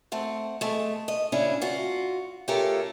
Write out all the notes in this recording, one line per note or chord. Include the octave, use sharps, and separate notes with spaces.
A3 C4 F#5
G#3 A3
D#5
A#2 C#3 C#4 D4 E4
F4 F#4
A3 C#4 F4 G4 A4 A#4